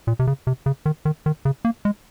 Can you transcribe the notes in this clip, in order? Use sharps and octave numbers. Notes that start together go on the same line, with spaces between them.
A#2
C3
C#3
C3
C#3
D#3
D#3
D#3
C#3
A#3
G#3